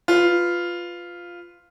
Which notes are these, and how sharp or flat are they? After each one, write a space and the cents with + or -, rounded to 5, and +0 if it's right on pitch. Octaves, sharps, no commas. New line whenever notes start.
F4 +0 B4 +15